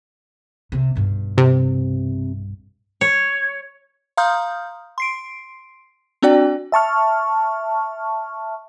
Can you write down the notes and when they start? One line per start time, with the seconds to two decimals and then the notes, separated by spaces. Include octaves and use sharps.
0.72 C3
0.95 B1 G2
1.38 C3
3.01 C#5
4.17 F5 A#5 C6 D#6 F6 G6
4.98 C6 C7 D7
6.22 C4 D4 F#4 D5 G5
6.72 E5 A5 C#6 F6